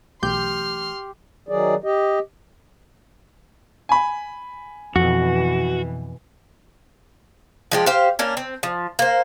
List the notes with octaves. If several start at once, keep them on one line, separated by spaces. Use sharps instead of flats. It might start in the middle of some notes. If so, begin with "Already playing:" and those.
B1 E3 F#3 A3 G4 C6 F6 G6
D#3 F#3 G#4 D5
G4 D#5
G#5 B5
F2 B2 E3 F#4
F3 G#3 G4
G4 C5 F5
A#3 C#4 D4
C4
F3
A#3 C5